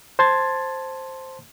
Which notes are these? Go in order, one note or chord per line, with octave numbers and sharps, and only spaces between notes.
C5 A5 C6 G#6 A6